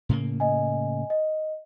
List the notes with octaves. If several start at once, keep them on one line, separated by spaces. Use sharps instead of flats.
A2 C#3 A#3
D#5 G#5
D#5